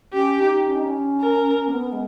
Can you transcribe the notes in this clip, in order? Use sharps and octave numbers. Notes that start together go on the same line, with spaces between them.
C#4 G4
D#4
C#4
D#4
C#4
A#4
A#3
B3
G#3